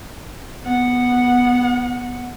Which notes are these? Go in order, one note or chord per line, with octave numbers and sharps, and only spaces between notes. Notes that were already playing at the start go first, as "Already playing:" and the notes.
B3 F#5